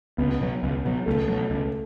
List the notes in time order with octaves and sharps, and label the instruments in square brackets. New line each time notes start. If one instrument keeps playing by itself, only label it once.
[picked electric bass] C#2 [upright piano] B3
[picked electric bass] B2 F#3
C#2
B2 F#3
[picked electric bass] C#2 [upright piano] A3
[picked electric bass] B2 F#3
C#2